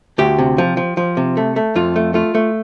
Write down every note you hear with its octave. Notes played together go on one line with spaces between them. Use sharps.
D2 G4
C3
F3
F3
F3
C3
A3
A3
F2 F4
A3
A3 F4
A3